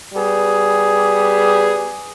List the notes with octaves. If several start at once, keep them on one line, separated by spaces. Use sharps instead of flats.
G3 B3 G#4